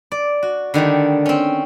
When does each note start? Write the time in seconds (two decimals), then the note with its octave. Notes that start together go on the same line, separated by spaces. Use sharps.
0.12 D5
0.43 F#4
0.74 D3 D#3 G3 A3
1.26 C4 C#4